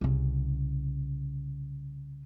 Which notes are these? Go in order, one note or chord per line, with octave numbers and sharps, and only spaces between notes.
C2 C#3